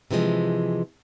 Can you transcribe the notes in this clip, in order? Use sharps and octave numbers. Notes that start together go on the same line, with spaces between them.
C3 E3 F3 G#3